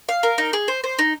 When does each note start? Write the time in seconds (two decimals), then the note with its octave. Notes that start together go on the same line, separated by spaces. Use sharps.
0.09 F5
0.23 A#4
0.38 D#4
0.53 G#4
0.68 C5
0.84 C5
0.99 D#4